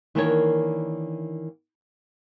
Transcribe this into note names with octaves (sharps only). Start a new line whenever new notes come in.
D#3 E3 A#3 D4 A#4 C#5